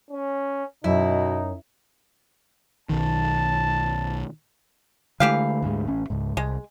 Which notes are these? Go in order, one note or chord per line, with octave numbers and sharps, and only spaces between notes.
C#4
F#2 B2 D#4 E4
B1 D#3 A5
D3 E3 G#3 A3 G4 F5
D2 G#2 G#3
A1 C#4
C#2 G#2
C2 G#3